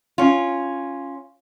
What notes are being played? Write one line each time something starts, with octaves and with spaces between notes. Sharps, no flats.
C#4 F4